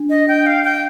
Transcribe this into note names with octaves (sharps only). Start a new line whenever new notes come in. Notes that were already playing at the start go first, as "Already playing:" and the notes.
Already playing: D4
D#5
G5
F5
G5